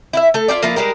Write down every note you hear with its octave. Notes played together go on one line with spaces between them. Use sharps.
E4 F4 E5
A3 A4
E4 F4 G4 D5
F3 A#3 E4 F4
G3 G#3 G4 A#4